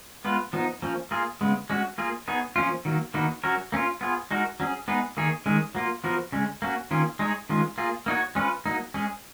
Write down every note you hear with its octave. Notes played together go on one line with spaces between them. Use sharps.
G#3 B3 F4 B4
F3 B3 D#4
F3 A#3 C#4
A#3 F4 G#4
C#3 G#3 B3
G#3 C#4 F#4
A#3 F4 G#4
B3 D#4 G#4 C#5
F3 A#3 C#4 F4
D#3 F#3 A#3
D#3 A#3 D#4 F#4 B4
F#3 C#4 F#4 A#4 C#5
A#3 C#4 F4
B3 F4 G#4
G#3 D#4 F#4 A#4
F#3 C#4 G#4
G#3 B3 D#4 G#4 B4
D#3 A#3 D#4 G#4 C#5
D#3 G#3 C#4 G#4
F#3 A#3 F4
F3 B3 F#4 A#4
C#3 G#3 C#4
A#3 C#4 F#4
D#3 A#3 C#4 F4 G#4
G#3 D#4 G#4 C#5
D#3 G#3 C#4 F4
A#3 F4 G#4
A#3 D#4 F#4 C#5
G#3 C#4 F4 B4
F#3 A#3 D#4
G#3 C#4 G#4